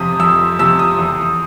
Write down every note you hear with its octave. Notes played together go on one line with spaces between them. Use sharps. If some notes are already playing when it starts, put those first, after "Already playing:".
Already playing: F2 C3 F3 D#6
F2 E6
C3 F3 E6
D#6
E2